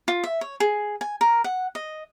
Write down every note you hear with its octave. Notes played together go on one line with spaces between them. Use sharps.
F4
E5
C#5
G#4
G#5
A#4
F#5
D#5